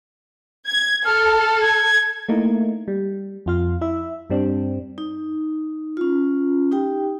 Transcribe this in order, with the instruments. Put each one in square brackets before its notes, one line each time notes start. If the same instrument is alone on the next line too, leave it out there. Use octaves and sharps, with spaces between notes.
[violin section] G#6
[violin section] A4 [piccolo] F6
[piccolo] G#6
[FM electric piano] A3 A#3 D#4 E4
G3
F2 F4 F5
E4 E5
G2 G3 C4 D4
[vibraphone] D#4
C#4 F4
D#4 G4 G5